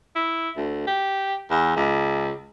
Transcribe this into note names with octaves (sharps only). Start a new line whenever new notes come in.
E4
D2
G4
E2
C#2